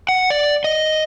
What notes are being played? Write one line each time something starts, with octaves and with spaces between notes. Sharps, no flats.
F#5
D5
D#5